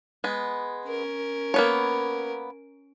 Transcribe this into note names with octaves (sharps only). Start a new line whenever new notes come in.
G#3 B3
C#4 A#4
A#3 B3 C#5